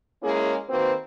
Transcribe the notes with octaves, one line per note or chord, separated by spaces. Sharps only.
G#3 A#3 C#4 E4 G#4
D#3 A#3 C4 F#4 B4